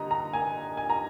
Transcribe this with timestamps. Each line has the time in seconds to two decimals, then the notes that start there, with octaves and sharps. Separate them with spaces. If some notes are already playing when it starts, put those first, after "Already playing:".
Already playing: D3 G3 D#5 A#5
0.11 A#5
0.33 G#5
0.77 G#5
0.90 A#5